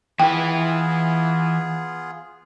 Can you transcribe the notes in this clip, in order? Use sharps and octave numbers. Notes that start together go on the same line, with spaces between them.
E3 B3 F4 G#4 B4 G5